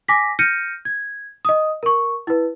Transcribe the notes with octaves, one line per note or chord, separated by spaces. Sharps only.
G#5 D6 A#6 B6
F6 G6 A#6 C#7 D#7
G#6
D#5 D#6
A#4 C#6
E4 B4